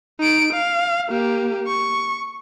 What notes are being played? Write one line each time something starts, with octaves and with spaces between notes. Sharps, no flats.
D#4 D7
F5
A#3 G4
C#6